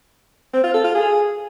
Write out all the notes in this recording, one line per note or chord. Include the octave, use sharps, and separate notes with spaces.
C4
F4
A4
F4
G#4